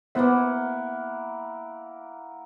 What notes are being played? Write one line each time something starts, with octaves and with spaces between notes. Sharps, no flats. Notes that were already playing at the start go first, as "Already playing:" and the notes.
A#3 B3 E4 C5 E5 F#5